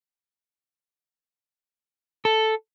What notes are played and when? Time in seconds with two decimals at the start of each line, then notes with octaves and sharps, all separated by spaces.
2.25 A4